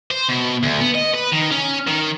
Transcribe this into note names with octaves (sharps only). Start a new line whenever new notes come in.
C5
B2
D2
B3
D#5
B4
D#3
C#4
D#3